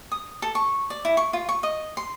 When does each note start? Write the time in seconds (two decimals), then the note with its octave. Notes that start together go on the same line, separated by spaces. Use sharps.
0.12 D#6
0.42 A4
0.55 C#6
0.90 D5
1.05 E4
1.17 C#6
1.33 F4
1.49 C#6
1.63 D#5
1.97 C6